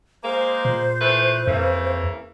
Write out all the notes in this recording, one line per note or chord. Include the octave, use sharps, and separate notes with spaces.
G#3 A#3 C5
A#2
E3 A3 B4
F2 C#3 E3 A#3